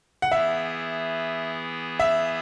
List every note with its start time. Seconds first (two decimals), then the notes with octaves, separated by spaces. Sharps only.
0.22 F#5
0.31 E3 B3 E4 G#4 E5
2.00 E5